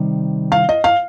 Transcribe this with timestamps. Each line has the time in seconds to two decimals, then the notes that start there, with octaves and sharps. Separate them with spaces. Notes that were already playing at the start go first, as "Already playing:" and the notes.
Already playing: C3 D#3 G3
0.52 F5
0.69 D#5
0.84 F5